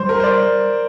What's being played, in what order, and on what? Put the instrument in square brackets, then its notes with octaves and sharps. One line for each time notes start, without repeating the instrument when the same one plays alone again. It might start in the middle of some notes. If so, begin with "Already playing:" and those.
Already playing: [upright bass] G3 [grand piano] C5
[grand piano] A#4
C5
D5